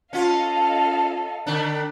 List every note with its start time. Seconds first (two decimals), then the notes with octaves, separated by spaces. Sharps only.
0.13 C#4 F4 A4 D#5 F5
1.47 D3 D4